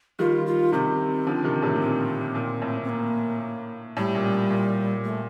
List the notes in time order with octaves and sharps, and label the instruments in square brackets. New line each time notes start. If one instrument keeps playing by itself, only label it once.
[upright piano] D#3 G3 [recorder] F4
[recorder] F4
[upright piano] C3 D#3 [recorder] C4
[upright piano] D3 F3
C3 D#3
A2 C3
[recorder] A#3
[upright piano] A#2 [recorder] C4
[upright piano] A#2
A2
[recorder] C4
A#3
[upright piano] A2 [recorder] G3
[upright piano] A#2
A#2
[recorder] A3